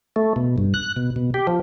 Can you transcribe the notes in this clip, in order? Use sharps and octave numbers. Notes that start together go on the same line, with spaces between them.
A3
B2
G2
F#6
B2
B2
G4
F3